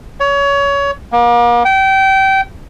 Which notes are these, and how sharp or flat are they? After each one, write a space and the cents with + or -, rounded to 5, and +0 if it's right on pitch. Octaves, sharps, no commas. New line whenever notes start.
C#5 +25
A#3 +40
G5 -25